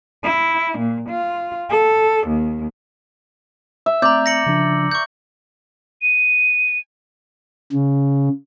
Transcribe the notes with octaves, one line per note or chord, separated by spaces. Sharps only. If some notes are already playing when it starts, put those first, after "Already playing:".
E4
A#2
F4
A4
D#2
E5
A3 C4 D5 A#5 G6
A#6 C#7 F#7
C#3 F3 D4
C#6 G6
D#7
C#3